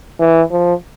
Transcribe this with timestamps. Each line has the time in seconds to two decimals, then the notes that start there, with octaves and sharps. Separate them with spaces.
0.20 E3
0.51 F3